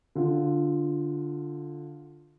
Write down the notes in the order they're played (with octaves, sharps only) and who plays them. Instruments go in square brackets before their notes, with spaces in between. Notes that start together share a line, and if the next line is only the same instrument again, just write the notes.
[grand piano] D3 F4